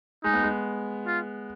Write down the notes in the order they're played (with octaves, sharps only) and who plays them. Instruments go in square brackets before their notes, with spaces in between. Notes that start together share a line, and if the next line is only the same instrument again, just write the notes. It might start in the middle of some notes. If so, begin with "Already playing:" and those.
[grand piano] G#3 [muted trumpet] D#4
[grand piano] B3
G#3
[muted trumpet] F4